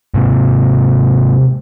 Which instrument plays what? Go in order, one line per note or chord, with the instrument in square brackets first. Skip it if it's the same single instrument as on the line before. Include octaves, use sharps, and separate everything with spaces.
[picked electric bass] G#2 C3